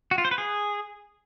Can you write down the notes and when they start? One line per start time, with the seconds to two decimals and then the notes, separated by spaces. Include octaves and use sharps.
0.11 F#4
0.18 F4
0.25 C5
0.31 B4
0.38 G#4